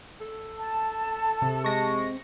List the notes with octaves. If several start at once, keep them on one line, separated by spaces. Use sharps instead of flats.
A4
A5
C3
G#3 C#6 A#6